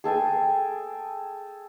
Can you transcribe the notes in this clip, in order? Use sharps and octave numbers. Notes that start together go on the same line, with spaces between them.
G#4 A4 G5 G#5